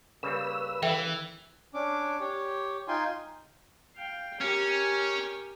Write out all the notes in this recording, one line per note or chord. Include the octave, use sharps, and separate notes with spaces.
C#3 G3 A#3 B4 E6
E3 A4 E5 G5
C#4 D4 D6
G4 C#5
D#4 F4 G5 G#5 C6
F5 G5
C#4 G4 A#4